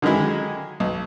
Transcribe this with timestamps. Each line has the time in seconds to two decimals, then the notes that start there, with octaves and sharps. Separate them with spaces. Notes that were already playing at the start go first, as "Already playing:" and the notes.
0.02 D3 D#3 F#3 G#3 E4
0.80 B1